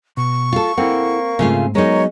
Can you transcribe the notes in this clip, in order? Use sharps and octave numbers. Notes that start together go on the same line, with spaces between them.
B2 C#6
F4 A4
A#3 C4 E4 A4 F#5
G#2 C#3 A3 C4 F4
F#3 G#3 B3 D#4 A#4 C#5